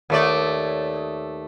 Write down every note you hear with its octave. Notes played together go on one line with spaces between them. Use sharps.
D#2 A3 D5